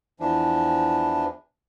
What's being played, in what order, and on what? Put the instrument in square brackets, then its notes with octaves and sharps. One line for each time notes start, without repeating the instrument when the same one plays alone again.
[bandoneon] E2 E3 F3 D4